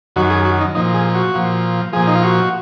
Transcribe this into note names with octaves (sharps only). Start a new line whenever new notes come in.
F#2 D#3 F#4
G#4
F#4
D#4
A#2 F3 D#4
G#4
F#4
A#2 F3
A#2 F3 G#4
D#4
F4
F#4